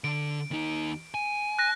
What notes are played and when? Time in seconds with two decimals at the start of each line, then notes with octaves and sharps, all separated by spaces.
0.04 D3 D7
0.51 D#2 D#4
1.14 G#5
1.59 F#6 A#6